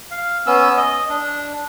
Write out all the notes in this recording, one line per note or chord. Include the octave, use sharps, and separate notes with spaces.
F5
B3 C#4 E6
D#5
D4